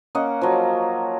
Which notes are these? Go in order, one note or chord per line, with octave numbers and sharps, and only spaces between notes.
A#3 C#4 D#5 F#5
F3 F#3